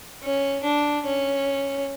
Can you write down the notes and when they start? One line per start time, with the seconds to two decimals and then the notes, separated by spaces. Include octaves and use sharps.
0.23 C#4
0.64 D4
1.06 C#4